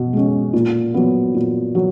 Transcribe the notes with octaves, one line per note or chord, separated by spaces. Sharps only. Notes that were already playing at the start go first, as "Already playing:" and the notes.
Already playing: B2
G#3 C#4
A#2
F#3 B3
A#2
F#3